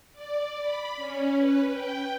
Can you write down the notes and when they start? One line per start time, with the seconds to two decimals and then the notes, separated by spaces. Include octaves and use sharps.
0.12 D5
0.59 B5
0.96 C#4
1.37 B4
1.72 G5